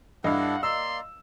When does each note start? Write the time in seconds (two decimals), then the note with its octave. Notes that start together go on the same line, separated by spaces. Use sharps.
0.24 G2 D4 E4 A4 D#5 F5 F#5
0.63 A#3 D5 A#5 C6 E6